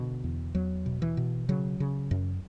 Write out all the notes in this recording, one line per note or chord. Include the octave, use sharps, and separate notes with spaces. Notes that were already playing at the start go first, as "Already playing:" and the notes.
Already playing: B2 D3
E2
E2 F#3
B2
E3
B2
C#3 F#3
C#3
F#2